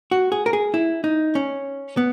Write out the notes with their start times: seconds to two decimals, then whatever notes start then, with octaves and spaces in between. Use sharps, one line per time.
0.11 F#4
0.32 G#4
0.46 A#4
0.53 G#4
0.74 E4
1.04 D#4
1.35 C#4
1.97 B3